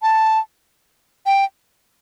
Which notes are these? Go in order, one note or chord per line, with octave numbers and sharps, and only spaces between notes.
A5
G5